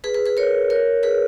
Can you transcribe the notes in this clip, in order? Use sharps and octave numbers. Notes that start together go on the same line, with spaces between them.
G#4 B4
G#4 B4
G#4 B4
A#4 C#5
A#4 C#5
G#4 B4